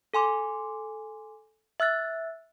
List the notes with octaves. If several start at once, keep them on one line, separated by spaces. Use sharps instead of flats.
A4 G#5 C6 D6
E5 E6 F#6 A6